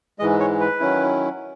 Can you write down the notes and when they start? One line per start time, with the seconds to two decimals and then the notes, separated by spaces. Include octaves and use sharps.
0.19 G#3 D#5
0.22 G#2 E3
0.40 C#5
0.60 B4
0.80 D#3 F#3 C#4 E4